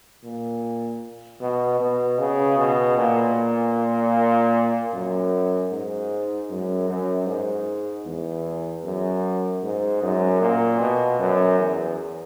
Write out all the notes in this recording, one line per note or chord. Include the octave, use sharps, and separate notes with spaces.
A#2
B2
B2
C#3
B2
A#2
F#2
G#2
F#2
F#2
G#2
E2
F#2
G#2
F#2
A#2
B2
F#2
E2